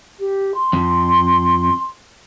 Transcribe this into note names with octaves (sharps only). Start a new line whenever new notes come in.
G4
C6
F2